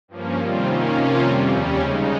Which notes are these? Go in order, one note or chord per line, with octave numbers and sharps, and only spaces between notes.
G2 F3 A#3 C#4
C3 D#3 G3 C4 F4
D#3 A#3 C#4
C3 F3 A#3 C#4 F4
F2 C3 G3
D#2 C#3 G3 C#4
C#3 G#3 D#4